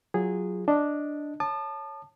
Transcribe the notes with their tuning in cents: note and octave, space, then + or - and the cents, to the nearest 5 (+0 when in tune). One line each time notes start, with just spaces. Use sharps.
F#3 +0 F4 +0 G#4 -15
D4 +0 D#5 +0
C#5 -5 A5 +0 D#6 -45